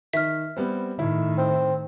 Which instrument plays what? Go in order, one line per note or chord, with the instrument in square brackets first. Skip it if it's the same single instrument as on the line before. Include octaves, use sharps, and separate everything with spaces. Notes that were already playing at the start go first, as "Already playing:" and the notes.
[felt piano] D#3 [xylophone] E5 F6
[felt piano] G3 B3 C4
[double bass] A2 D#3 [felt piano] E4
[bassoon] C4